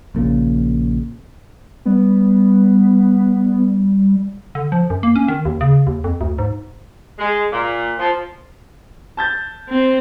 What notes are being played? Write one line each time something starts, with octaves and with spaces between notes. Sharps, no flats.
A#1 A#2 C#3
G3 B3
D3
F3
F#2
A#3
C#4
D#3
D#2
C#3
D#2
F2
D2
G#2
G#3
A#2
F3
A5 G6 A6
C4